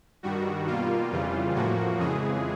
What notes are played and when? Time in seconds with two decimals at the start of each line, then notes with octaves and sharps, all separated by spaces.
0.23 G2 D#3 G3 F#4
0.67 B2 G3 A#3 F4
1.12 F2 C#3 E3 G3
1.55 A2 F3 A#3 F#4
1.99 F2 C#3 E3 G#3 G#4